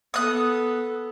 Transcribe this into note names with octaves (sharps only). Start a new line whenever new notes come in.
B3 A4 D#6 F#6